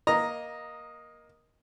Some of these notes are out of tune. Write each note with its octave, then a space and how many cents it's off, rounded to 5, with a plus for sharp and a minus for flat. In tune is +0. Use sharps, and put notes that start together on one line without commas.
A#3 +15 D#5 +0 A#5 +0